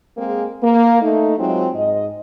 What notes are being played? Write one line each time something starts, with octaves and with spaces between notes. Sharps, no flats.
G#3 A#3 C4 G#4
A#3
A3 D#4
F#3 G#3 C4 F4 F#4
G#2 D#5